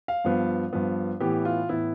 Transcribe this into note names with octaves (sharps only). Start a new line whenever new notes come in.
F5
G2 F3 B3
G2 F3 B3
A2 E3 B3 G4
F4
A2 E3 B3 E4